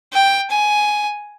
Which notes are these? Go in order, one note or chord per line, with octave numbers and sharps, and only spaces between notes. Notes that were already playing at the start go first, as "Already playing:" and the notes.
G5
G#5